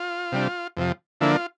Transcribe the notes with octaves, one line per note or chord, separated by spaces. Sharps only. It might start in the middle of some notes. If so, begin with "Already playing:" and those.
Already playing: F4
C3 G3 D4
F2 C3 F3
D3 F3 A#3 D4 E4
F4